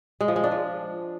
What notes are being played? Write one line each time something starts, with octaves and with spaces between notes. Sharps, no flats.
G#3
F3
G#3
D4
F3